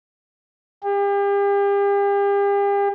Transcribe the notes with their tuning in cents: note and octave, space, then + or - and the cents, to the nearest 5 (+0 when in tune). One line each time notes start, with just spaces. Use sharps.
G4 +40